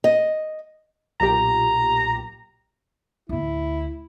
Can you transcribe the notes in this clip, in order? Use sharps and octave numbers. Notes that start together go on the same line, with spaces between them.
D#5
B1 A#2 G4 A#5
D2 A2 E4